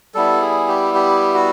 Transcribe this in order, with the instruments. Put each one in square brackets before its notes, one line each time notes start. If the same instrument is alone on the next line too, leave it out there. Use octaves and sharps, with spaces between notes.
[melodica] G3 B3 E4 A4
G#4
G4
G4
F#4